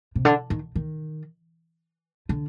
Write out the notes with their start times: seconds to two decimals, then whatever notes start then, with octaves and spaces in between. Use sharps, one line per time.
0.15 C3
0.25 D3
0.50 D#3
0.75 D#3
2.29 D3